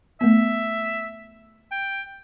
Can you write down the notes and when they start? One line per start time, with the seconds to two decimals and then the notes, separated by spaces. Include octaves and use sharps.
0.21 A3 B3 E5
1.72 G5